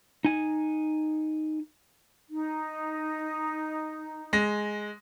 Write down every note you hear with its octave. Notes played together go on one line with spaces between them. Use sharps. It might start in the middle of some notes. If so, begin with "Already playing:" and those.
D#4 G#5
D#4
G#3 A#6